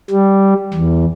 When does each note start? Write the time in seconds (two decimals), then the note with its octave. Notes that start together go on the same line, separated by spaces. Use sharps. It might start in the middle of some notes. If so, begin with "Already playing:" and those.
0.10 G3
0.74 E2